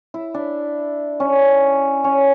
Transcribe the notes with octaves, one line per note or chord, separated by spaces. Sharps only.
E4
D4
C#4
C#4